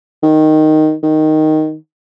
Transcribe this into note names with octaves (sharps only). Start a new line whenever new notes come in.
D#3
D#3